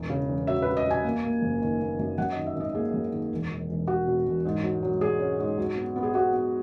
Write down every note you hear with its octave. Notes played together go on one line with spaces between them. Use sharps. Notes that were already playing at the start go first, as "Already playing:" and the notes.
Already playing: E1 E2
C#3
E2
F#3 E5
B4
F#3
D#5
F#3
G#5
A#3
A#3
F#1
D#3
A#3
F#2
F#2 F#5
D#5
D#3
E5
G#1
D#5
A#3 G#4
F#2
D#3
E1
E1
E1
E1 F#4
B2
E1
G#2
F#3
F#3
F#3 G#4
C#4
G#2
F#3
B3
B3
G#4
B3 F#4
B3